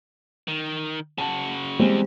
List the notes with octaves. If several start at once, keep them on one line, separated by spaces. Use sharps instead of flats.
D#3
C#3 F#4 A5
E2 G3 G#3 C4